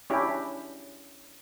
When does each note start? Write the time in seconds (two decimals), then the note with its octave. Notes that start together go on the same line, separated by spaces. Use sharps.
0.10 C#4 D4 E4 G4